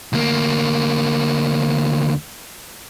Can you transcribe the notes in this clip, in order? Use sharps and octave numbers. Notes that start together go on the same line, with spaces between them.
D2 A#3